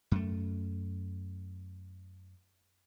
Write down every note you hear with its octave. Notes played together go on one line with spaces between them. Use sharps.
F#2 A3